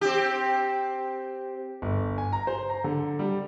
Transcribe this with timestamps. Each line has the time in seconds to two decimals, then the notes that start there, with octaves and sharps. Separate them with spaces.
0.01 C4 G4
1.82 G1
2.18 G#5
2.32 A#5
2.47 C5
2.70 A#5
2.84 D3
3.19 G3